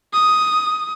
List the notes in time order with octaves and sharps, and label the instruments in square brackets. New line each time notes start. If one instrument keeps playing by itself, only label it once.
[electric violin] D#6